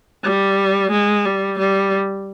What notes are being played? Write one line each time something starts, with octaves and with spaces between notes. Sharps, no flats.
G3
G#3
G3
G3